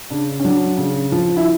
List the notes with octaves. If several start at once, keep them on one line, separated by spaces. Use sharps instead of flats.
C#3 D4
C#4
F#3 D4
C#3
F3
E4